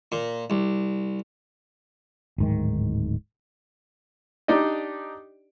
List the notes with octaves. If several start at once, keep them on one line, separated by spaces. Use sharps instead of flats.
A#2
C2
D1 G#2 D#3
D4 D#4 G4 D5 D#5